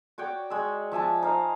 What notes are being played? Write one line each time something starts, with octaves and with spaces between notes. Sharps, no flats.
F#4 C#5 D5 G5
G#3 E6
F3 E5 G#5 A5
D#4 C5 F5